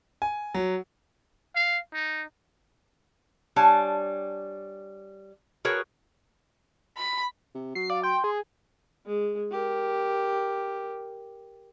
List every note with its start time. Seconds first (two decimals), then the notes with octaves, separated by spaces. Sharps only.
0.22 G#5
0.54 F#3
1.55 F5
1.93 D#4
3.56 G3 D4 C#5 F5 G#5 A5
5.65 F#4 G#4 A#4 B4 C#5
6.97 B5
7.55 C3
7.75 F#3 C7
7.90 D5 F5
8.03 G5 C6
8.24 G#4
9.06 G#3
9.51 G4 A#4